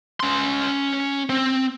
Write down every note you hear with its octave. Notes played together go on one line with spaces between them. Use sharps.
C#4 C6
C4